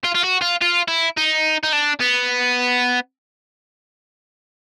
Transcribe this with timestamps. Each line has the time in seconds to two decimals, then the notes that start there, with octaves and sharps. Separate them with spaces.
0.04 F4
0.15 F4
0.23 F#4
0.41 F4
0.61 F4
0.88 E4
1.17 D#4
1.63 D#4
1.73 D4
2.01 B3